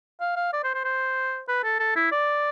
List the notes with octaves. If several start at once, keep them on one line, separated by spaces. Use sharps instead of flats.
F5
F5
D5
C5
C5
C5
B4
A4
A4
E4
D5